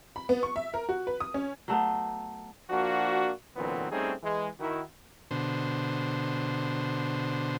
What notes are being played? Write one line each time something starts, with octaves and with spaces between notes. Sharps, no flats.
B5
B3
C#6
E5
A#4
F#4
B4
D#6
C#4
F#3 A3 B3 C5
F3 A#3 D4 F#4
A#2 D3 E3 F#3 B3 C4
G3 A3 C4 C#4 D#4 G#4
E3 G#3
D#3 E4 F#4
B2 D3 C5